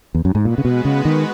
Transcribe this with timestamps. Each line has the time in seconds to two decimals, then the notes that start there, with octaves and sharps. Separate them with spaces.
0.15 E2
0.25 F#2
0.35 G#2
0.45 A#2 G#3 B3 F#4 B4
0.58 C#3
0.65 B2
0.85 C#3
1.05 D#3